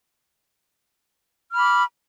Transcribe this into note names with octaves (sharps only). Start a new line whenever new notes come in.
B5 D6 F6